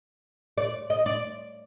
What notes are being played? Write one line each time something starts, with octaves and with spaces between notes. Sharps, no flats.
D5
D#5
D5